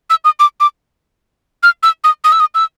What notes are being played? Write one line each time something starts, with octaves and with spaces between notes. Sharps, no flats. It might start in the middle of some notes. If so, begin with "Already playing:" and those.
E6
D#6
D6
D6
F6
E6
D#6
D#6
E6
D#6
E6